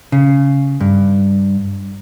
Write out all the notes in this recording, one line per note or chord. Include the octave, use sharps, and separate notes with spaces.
C#3
G2